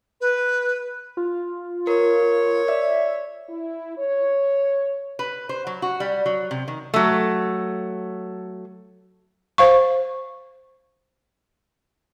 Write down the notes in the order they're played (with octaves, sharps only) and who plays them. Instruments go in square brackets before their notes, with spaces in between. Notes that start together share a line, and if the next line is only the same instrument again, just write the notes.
[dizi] B4
[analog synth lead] F4
[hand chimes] A#4 [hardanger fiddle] C#5
[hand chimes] D5 [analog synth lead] E5
[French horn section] E4
C#5
[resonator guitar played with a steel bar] B4
C5
F#3
F#4
G3
F#3
C3
D#3
F#3 A3
[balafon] C5 F5 C#6